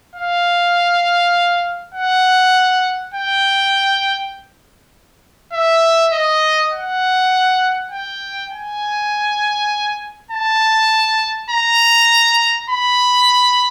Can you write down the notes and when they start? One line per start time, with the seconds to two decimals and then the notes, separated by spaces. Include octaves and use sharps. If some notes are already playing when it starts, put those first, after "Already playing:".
0.16 F5
1.94 F#5
3.14 G5
5.53 E5
6.13 D#5
6.73 F#5
7.92 G5
8.52 G#5
10.31 A5
11.51 A#5
12.70 B5